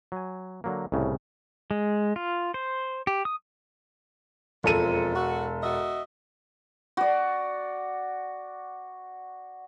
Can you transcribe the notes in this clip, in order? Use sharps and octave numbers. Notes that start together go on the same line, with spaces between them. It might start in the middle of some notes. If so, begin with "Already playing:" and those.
F#3 G#5
D3 F#3 A#3
C2 A2 C#3
G#3
F4
C5
G4
D#6
E1 F2 A4 D#7
F#4
F#4 D#5 E5
F#4 D5